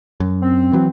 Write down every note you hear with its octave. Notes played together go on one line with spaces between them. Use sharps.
F#2
C4
E3 F#3